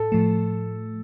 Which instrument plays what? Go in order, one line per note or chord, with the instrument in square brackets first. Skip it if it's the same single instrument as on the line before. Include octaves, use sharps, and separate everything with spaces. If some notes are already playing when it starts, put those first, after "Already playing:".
Already playing: [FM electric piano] A2 [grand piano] A4
[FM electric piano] A2 F3 A3